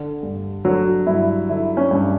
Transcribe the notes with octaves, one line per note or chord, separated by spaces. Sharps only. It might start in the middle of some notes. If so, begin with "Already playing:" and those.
Already playing: D3
G2
D3 F#3
G2 E4
D3 E4
C#4
G2